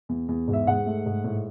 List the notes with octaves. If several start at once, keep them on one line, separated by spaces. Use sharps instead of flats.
E2
E2
G#2
E5
G#2 F#5
A3
G#2
A2